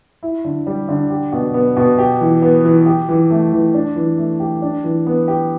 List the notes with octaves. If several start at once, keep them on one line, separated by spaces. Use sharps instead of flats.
E4
D3
G3
D3
G4
B2
B3
B2
G4
E3
B3
E3
G4
E3
A3
E3
D4
E3
A3
G4
D4
E3
B3
G4